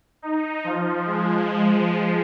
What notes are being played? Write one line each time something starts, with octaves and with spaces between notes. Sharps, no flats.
D#4
F3
G#3